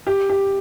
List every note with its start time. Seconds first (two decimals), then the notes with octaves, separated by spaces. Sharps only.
0.07 G4
0.29 G4